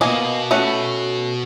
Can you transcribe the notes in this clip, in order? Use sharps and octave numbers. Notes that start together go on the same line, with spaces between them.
B2 A#3 D#5 G#5
A3 C#4 F#5